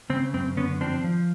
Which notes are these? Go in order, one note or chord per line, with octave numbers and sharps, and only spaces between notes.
C#3 C4
F#2 C4
D3 B3 C#4
F3 C4 D4
F3